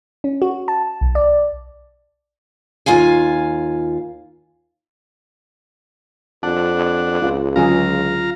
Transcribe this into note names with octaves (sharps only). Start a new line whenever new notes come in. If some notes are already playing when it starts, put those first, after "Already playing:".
C#4
F#4
A5
B1
D5
D#2 F4 F5 G#5
F2 D4 F#5 A5
C#2 F4
D3 F#3 C#4 F4 G#4 F5 A#5